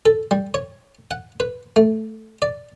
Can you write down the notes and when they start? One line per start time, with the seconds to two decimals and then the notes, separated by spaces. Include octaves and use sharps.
0.06 A4
0.31 G3
0.54 C#5
1.11 F#5
1.40 B4
1.76 A3
2.42 D5